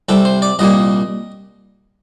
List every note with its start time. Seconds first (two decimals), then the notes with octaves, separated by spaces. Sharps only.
0.09 C2 C3 G3 A4
0.25 C5
0.42 D5
0.59 C2 A#2 G3 A#3 D#5